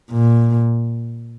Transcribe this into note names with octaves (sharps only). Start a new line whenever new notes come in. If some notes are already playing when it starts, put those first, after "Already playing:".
A#2